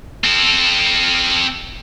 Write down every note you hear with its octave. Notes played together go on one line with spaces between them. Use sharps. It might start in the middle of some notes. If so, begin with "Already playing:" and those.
C4 A4